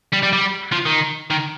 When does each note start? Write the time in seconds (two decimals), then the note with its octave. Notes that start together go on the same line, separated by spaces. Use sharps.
0.12 G3
0.23 G3
0.33 G3
0.72 F3
0.86 D#3
1.30 D#3